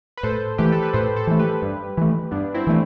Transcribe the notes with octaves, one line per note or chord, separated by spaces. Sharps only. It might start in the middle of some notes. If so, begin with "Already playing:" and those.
B4
A2 A4 C5
E3 A3 G4 B4
A4
B4
A2 A4 C5
A4 C5
E3 A3
G4 B4
G2
E3 A3
G2 B3 D4
C4 E4
E3 A3